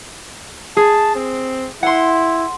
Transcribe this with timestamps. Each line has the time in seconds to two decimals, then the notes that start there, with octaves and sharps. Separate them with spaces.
0.77 G#4 A5
1.15 C4
1.83 E4 F#5 C6